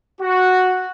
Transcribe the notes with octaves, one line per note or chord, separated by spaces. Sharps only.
F#4